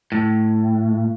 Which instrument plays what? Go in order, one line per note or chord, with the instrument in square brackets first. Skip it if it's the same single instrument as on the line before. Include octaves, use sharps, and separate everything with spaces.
[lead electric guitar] A2